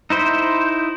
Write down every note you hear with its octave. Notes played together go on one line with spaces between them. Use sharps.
D#4 E4 C5